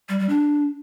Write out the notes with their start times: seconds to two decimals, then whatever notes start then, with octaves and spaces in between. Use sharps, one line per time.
0.09 G3
0.19 G3
0.29 D4